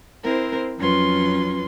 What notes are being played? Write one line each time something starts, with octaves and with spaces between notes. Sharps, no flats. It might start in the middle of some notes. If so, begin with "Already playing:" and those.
C4 E4 A#4 C5
F2 F#3 C#4 F4 B4 C6